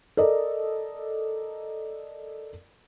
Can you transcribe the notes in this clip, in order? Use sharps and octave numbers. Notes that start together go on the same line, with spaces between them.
A4 A#4 D5 D#5